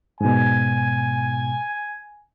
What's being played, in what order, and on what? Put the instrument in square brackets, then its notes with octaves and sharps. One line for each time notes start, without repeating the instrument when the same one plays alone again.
[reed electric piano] G#2 B2 [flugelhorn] G#5